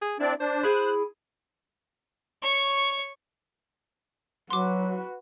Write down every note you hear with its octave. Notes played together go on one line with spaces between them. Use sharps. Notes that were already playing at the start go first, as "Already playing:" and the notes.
G#4
C4 D4 E4 D5
D4 C5
E4 G#4 G#5 F#6
C#5 C#6
F#3 F#4 B4 C6 D6